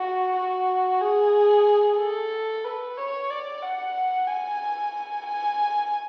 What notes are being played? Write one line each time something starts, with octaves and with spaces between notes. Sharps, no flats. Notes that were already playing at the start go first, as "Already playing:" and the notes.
Already playing: F#4
F#4
G#4
A4
B4
C#5
D5
F#5
G#5
G#5